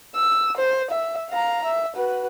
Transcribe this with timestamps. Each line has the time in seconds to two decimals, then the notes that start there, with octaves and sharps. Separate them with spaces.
0.15 E6
0.57 C5
0.91 E5
1.30 F5 A#5
1.65 E5
1.96 F#4 B4